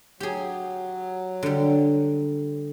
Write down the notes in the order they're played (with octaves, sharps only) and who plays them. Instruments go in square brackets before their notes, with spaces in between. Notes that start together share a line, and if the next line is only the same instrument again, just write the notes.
[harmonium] F#3 [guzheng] G4 G#4
[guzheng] D3 G3